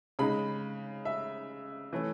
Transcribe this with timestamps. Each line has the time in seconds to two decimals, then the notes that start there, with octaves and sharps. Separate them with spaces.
0.19 C#3 G#3 D#4 B5
1.05 E5
1.93 E3 A3 C#4